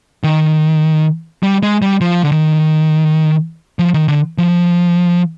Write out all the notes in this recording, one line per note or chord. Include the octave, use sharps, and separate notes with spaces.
D#3
G3
G#3
G3
F3
D3
D#3
F3
D#3
D3
F3